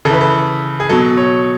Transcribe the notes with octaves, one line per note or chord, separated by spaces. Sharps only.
C#3 E3 A4 B4
A4
G#4
B2 F#3 A4
C#5